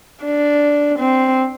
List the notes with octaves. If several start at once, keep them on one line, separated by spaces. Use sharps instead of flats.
D4
C4